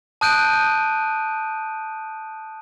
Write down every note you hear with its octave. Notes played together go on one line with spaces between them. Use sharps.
A5 D#6 F#6 G6 D7 D#7